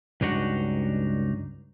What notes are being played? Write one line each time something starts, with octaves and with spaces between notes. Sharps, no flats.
C#2 G2 D4 D#4 F#4 F#5